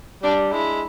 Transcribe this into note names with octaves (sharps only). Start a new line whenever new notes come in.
G3 D4
G#3 E4